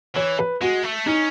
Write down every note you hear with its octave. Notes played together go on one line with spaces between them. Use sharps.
E3 C#5
B4
G#3 F#4
A3
C#4 D#4